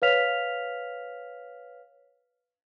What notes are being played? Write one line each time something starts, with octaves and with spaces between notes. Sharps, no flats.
B4 C#5 F5 F6 B6 F7